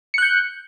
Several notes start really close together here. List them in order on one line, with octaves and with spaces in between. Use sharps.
C#7 F#6 G6